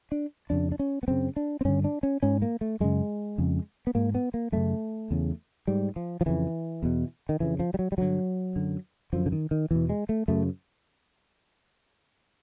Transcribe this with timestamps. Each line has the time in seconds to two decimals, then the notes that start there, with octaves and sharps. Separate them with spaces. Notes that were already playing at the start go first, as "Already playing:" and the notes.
0.12 D4
0.50 F2 C#3 D4
0.72 D4
0.79 C#4
1.03 B3
1.08 F#2 C#3 C4
1.36 D4
1.61 C4
1.65 G2 D3 C#4
1.84 D4
2.03 C#4
2.23 G#2 C#4
2.42 A#3
2.61 A3
2.80 F#2 C#3 G#3
3.38 F2 C#3
3.87 B3
3.95 G#2 A#3
4.15 B3
4.34 A#3
4.52 F#2 C#3 A3
5.11 E2 C#3
5.67 G#2 G3
5.96 F3
6.21 F3
6.26 F2 C#3 E3
6.83 E2 B2
7.29 D#3
7.40 F2 C#3 E3
7.59 F3
7.74 G3
7.79 F#3
7.92 G3
7.98 G2 D3 F#3
8.56 F#2 D3
9.13 F#2 D3 F3
9.26 D3
9.32 D#3
9.51 D#3
9.71 E2 B2 E3
9.90 G#3
10.09 A3
10.28 F#2 C#3 A3